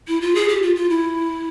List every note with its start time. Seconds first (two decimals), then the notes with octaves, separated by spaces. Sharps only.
0.08 E4
0.21 F4
0.35 G#4
0.49 G4
0.62 F4
0.76 F4
0.90 E4